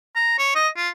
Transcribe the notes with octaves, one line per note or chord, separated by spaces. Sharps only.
A#5
C#5
D#5
F4